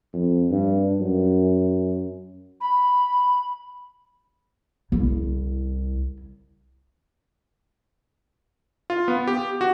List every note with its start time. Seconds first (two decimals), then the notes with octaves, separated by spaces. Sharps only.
0.13 F2
0.51 G2
1.00 F#2
2.61 B5
4.92 C2 C#3 E4
8.90 F4
9.08 B3
9.27 G4
9.61 F#4